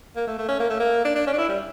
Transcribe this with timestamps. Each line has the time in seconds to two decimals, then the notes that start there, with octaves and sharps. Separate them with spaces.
0.16 A#3
0.27 A3
0.38 A3
0.48 C#4
0.60 A#3
0.70 A3
0.80 A#3
1.05 D4
1.16 D4
1.27 C#4
1.33 D4
1.38 E4
1.49 G3